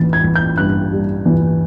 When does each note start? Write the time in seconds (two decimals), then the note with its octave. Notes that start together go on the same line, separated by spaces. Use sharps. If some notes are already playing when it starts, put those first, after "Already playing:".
Already playing: A1 E3 A6
0.13 G#6
0.23 A1
0.36 G6
0.58 G2 F#6
0.92 G3
1.26 E3